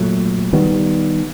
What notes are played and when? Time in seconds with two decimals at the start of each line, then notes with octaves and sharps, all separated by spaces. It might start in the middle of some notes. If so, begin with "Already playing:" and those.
Already playing: A#2 F#3 A3
0.53 D#3 G3 B3